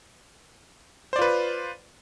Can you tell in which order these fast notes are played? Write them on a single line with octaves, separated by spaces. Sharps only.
C5 D5 F4 B4